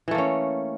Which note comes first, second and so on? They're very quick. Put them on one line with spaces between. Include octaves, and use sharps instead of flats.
E3 A3 A#3 C#4